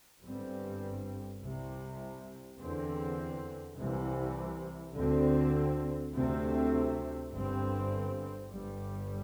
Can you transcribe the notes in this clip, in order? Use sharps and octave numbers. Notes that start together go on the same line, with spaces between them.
G1 G2 G3 C4
C2 C3 G3
E2 D3 C4
C2 C3 E3
D2 D3 C4
D2 C3 A3 C4
G1 G2 G3 C4
G1 G2 G3